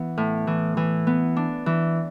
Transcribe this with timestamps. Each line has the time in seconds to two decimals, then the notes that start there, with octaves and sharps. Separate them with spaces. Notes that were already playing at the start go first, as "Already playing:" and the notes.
Already playing: E3 B3
0.17 A2
0.47 E3
0.77 E3
1.07 B3
1.36 D4
1.66 E3